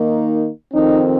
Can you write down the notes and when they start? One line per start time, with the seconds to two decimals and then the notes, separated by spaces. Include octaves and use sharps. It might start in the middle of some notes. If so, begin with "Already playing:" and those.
Already playing: D#3 A#3 D#4
0.74 F2 D#3 C4 D#4